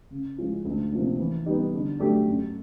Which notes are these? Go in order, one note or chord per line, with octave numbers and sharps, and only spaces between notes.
C#3
F3 G#3 C#4 F4
D2
C3 F3 A#3 D4
E3
G3 B3 D#4 G4
D3
F#3 A3 D4 G4
F#2